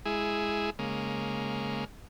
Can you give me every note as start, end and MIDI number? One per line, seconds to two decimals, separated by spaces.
0.05 0.70 56
0.05 0.70 64
0.05 0.70 68
0.79 1.85 49
0.79 1.85 56
0.79 1.85 58